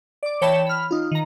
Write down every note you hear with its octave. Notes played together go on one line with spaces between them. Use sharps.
D5 D6
E3 C#5 G5 A5 B5 E7
B5 F6
D#4 F4
D#3 A#5